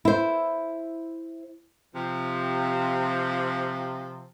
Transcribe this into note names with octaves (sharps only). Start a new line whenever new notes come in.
E4 C5
C3 F3